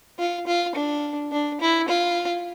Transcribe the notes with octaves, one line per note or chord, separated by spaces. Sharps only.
F4
F4
D4
D4
E4
F4